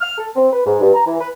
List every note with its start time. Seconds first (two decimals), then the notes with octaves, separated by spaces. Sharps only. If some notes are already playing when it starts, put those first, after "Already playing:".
0.01 F6
0.18 A4
0.36 C4
0.53 B4
0.66 G#2
0.81 G2
0.94 A#5
1.07 E3
1.21 B4